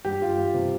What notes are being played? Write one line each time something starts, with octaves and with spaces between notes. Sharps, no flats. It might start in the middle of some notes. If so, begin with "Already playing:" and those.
G2 G4
F4
G2
C3